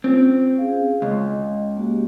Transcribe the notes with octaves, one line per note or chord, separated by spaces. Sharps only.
C4 C#4 F4
G#4 F5
C#2 D#5
A#3 F#4 G4